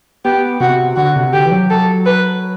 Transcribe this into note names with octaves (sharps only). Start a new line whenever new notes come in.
B3 G4
C3 F#4
D3 F#4
C3
D3 G4
E3
F#3
A4
B4